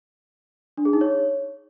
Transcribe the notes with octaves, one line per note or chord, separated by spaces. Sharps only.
D4
G#4
D#4
C#5